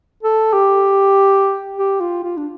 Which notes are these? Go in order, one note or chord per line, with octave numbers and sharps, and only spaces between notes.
A4
G4
G4
F4
F4
D4